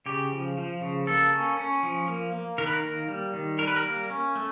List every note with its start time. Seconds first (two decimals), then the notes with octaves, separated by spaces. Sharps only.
0.06 C#3 G4
0.31 F3
0.57 F3
0.81 C#3
1.07 A#3 A4
1.33 C#4
1.57 C#4
1.83 F3
2.08 A#3
2.33 A#3
2.58 D#3 A#4
2.66 B4
2.73 A#4
2.83 A#3
3.08 G3
3.34 D#3
3.59 G3 A#4
3.67 B4
3.76 A#4
3.85 A#3
4.10 C#4
4.35 A3